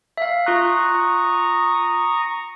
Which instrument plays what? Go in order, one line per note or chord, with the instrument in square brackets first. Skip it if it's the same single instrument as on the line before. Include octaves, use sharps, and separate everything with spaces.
[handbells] E5 F5
[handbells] F4 F#6 [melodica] A#5 C#6 D#6